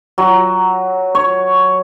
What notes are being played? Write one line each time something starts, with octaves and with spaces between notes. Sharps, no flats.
F#3
C#5